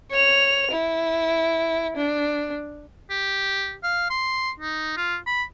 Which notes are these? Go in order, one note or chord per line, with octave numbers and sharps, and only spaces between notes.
C#5 F7
E4
D4
G4
F5
C6
D#4
F4
B5